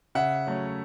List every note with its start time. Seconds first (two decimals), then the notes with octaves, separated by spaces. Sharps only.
0.15 C#3 E5 F#5
0.47 F#3 A3 C#4